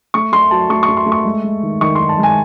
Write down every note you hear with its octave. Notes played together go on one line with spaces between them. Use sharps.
A3 C#6
A3 C6
F#3 A5
A3 C#6
C#6
A3
C6
A3
C#6
G#3
G#3
D#3
D#3 C#6
D#3 C6
A5
G#3
G#5